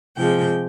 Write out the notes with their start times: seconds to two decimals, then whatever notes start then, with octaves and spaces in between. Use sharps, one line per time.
0.17 C3 F3 G#3 G5